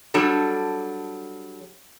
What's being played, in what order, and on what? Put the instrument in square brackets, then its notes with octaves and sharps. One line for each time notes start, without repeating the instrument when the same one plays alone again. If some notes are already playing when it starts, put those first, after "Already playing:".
[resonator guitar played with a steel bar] F#3 G3 D4 A4